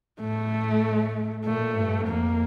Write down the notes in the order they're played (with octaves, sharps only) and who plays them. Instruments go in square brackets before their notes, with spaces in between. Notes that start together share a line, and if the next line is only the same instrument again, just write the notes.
[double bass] A2 [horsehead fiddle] A3
[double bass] A#2 [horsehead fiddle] A3
[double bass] G2
[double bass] F2 [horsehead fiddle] A#3